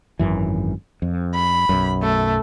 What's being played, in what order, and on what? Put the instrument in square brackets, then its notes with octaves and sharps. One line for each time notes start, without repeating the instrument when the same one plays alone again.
[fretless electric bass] G#1 F#2 E3
F2
[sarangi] B5
[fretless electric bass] B1 F#2
[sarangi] A3